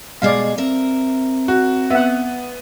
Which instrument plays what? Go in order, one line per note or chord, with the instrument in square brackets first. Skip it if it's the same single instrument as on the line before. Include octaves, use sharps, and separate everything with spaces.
[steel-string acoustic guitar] B2 G#3 G#4 [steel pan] D5 F5
[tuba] C4 [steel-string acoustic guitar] A#4 E5
[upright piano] F#4
[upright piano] B3 [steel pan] E5 F#5